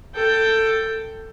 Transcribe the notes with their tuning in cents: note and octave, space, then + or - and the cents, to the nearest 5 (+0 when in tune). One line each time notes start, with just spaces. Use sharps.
A4 +15 G5 +0